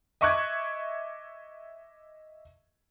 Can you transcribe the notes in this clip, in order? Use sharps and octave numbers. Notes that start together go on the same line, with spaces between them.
D#5 E5 C#6 D6 F#6 G#6